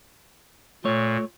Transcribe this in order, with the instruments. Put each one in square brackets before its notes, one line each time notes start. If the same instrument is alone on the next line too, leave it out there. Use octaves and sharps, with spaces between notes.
[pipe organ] A#2 [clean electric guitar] A3 C#5